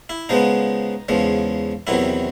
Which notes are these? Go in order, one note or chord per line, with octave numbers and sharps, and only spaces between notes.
E4
C#3 F3 G#3 B3 D#4
E2 C#3 F3 G#3
E2 C3 D#3 F#3 E4